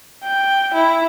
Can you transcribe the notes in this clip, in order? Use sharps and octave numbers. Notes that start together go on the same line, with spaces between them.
G5
E4